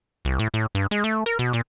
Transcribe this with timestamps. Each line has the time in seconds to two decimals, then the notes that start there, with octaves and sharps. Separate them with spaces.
0.25 C2
0.39 A2
0.54 A2
0.75 G2
0.91 G#3
1.04 A3
1.26 A#4
1.39 B2
1.53 A#2